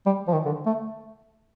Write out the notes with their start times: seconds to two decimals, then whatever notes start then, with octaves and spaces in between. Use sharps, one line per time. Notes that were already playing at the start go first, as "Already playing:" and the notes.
0.06 G3
0.27 F3
0.32 D#3
0.45 D3
0.66 A3